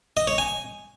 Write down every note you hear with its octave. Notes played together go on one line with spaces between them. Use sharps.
D#5
C#5
G#5